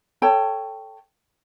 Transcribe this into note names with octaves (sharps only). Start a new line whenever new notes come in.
A4 C#5 G5 A5